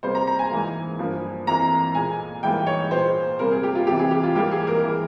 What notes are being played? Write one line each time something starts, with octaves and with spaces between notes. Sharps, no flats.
C3 G3 A#3 C5
A#5
A#5
G#5
G#2 E3 A#3
G2 F3 A#3
F2 E3 A#3 A#5
A#2 G#3 G#5
G#2 E3 G3 A#3 G5
C#5
A#2 G#3 C5
C3 G3 A#3 A#4
G#4
G4
F4
F2 C3 E3 G4
G#4
G4
F4
G#2 E3 G3 A#3 G4
G#4
A#4
E3 G#3